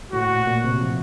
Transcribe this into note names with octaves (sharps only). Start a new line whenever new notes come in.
A2 F#4
A#2
A#2
C3
F3